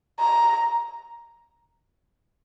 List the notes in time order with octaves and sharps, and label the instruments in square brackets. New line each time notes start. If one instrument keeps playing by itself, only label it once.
[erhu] A#5